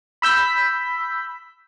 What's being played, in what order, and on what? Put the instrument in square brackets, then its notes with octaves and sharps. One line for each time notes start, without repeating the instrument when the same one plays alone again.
[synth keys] B5 E6 G6 B6